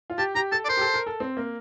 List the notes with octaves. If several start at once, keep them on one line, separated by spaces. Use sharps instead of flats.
F4
G4 A5
G4 A#5
A4 A5
D5
A#4 C5
G4
A4
A#4
A4
C4
A#3